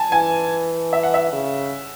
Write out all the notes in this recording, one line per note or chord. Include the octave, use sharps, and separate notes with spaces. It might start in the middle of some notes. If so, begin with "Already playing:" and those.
Already playing: G#5 A5
E3 G#5
E5
F#5
E5
C#3